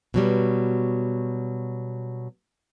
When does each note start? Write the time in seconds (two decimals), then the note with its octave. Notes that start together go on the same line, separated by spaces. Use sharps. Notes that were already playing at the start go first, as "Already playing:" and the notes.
0.14 B2 F#3 G3